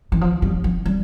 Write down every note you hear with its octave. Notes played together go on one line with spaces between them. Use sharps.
E3
F3
G3
F3
G3